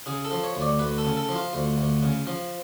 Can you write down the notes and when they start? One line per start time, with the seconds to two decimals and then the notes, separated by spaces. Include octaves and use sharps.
0.06 C#3 G#4
0.25 A4
0.31 F3
0.44 C#5
0.55 D2
0.62 D5
0.79 D2 B4
0.98 A4
1.05 C#3
1.17 A4
1.29 F3
1.35 F4
1.53 D2
1.78 D2
2.03 C#3
2.27 F3